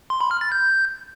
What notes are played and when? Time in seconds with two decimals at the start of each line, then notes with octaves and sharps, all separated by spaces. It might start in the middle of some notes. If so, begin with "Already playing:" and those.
0.10 C6
0.20 B5
0.31 F6
0.41 A6
0.52 G6